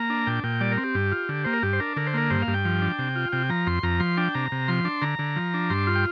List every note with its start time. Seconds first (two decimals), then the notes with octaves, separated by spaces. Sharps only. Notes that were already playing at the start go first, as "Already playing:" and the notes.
Already playing: A#3 A#5
0.10 D4
0.27 A#2 G5
0.44 A#2 G5
0.61 G3 D5
0.72 A#4
0.77 C4
0.84 G4
0.95 G2
1.12 F4
1.29 D3
1.44 A#3 C5
1.53 A#4
1.63 G2 G4
1.73 C5
1.80 D4 A#4
1.96 D3 A#4
2.07 C5
2.14 A#3 A#4
2.30 G2 C5
2.42 F5
2.47 G2
2.54 G5
2.65 F3
2.82 D4
2.99 C3
3.16 F4
3.32 C3 G5
3.49 F3 A#5
3.67 F2 C6
3.83 F2 A#5
4.00 F3 C6
4.17 D4 G5
4.35 C3 A#5
4.52 C3
4.68 F3 C6
4.85 D4
5.02 D3 A#5
5.19 D3
5.36 F3
5.54 D4
5.70 G2 C6
5.87 F4
5.95 G5